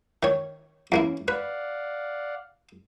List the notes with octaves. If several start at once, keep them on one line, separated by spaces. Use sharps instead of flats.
D#3 C#5
E2 A#3 C#4 E4
B4 D5 F5 F#5